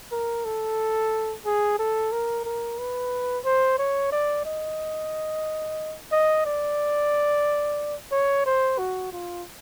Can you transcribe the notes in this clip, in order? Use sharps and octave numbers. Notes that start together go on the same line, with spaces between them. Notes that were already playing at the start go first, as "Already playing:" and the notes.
A#4
A4
G#4
A4
A#4
A#4
B4
C5
C#5
D5
D#5
D#5
D5
C#5
C5
F#4
F4